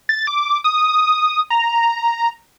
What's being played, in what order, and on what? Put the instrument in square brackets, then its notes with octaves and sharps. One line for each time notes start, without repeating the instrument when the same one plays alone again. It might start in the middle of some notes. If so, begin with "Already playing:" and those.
[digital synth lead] A6
D6
D#6
A#5